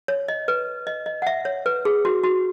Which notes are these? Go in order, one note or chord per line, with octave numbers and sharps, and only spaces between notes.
C#5
D#5
B4
D#5
D#5
F#5
E5
C#5
B4
G#4
F#4
F#4